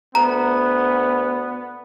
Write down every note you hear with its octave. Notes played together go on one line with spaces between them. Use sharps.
D2 B3 A#5